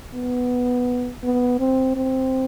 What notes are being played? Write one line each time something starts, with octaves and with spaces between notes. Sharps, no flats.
B3
B3
C4
C4